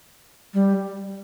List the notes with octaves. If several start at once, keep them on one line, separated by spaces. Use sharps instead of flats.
G3